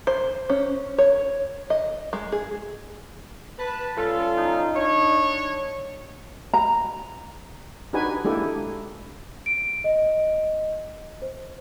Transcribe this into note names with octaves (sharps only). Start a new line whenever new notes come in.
C5
C#4
C#5
D#5
G#3
G#4
B4 A5
G3 C#4 F4 A4
D#4
D4 C#5
A#5
D4 D#4 F#4 G4 B4 G#5
G#3 A#3 D4 E4 G4 A4
D7
D#5
C5